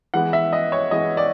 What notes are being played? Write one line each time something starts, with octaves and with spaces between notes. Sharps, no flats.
E3 G#3 B3 F#5
E5
D#5
C#5
E3 G#3 B3 D#5
D5